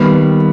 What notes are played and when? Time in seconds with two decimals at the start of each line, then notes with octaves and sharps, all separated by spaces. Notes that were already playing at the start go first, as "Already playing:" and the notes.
Already playing: D#3 G3 A#3 B3